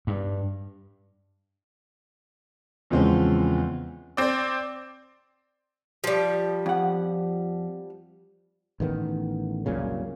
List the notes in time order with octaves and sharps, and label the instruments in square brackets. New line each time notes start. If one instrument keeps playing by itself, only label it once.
[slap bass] G2
[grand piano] E2 C#3 F3 G#3 C4 C#4
[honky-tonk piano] C4 D5
[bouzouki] F3 G3
[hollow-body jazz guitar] F2 F#5
[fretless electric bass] A1 D#3 A3 B3
C2 F#2 A#2 C#3